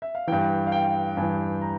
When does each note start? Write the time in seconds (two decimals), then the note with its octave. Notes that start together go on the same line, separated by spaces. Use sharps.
0.02 E5
0.15 F5
0.27 G2 E3 G5
0.67 F5
0.72 G5
1.17 G2 E3 G#5
1.61 A#5